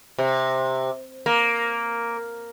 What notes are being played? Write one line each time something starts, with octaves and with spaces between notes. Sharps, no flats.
C3
A#3